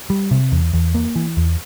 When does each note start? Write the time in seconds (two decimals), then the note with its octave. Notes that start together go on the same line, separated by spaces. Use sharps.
0.10 G3
0.31 C3
0.52 E2
0.73 E2
0.95 A#3
1.16 E3
1.37 E2